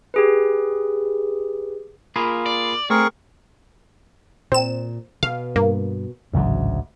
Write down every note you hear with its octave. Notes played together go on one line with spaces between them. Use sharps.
G4 G#4 B4
A#3 F4 G#4 B5
D5
A3 C4 G#4 A#4 C#6
A#2 C4 E7
B2 F5
G2 A#3
A1 D2 G#2 C#3 F#3